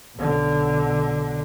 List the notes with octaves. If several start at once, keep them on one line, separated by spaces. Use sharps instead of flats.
B1 D3